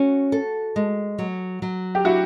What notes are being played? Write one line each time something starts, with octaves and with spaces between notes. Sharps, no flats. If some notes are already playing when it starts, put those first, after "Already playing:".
Already playing: C#4 F#4
A4
G#3
F#3
F#3
G4
D4 E4 F#4